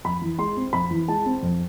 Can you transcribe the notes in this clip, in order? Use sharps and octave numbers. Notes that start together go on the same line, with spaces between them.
F2 B5
E3
G#3 C6
C4
F2 B5
E3
G#3 A5
C4
F2